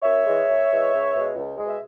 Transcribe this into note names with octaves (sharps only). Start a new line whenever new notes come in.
F#2 C#5 E5
E3 G#3
F#2
E3 G#3
C#2
B2 G#3
C#2
B2 G#3
E5